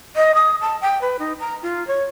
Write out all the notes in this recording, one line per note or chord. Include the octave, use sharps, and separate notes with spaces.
D#5
D#6
A5
G5
B4
D#4
A#5
F4
C#5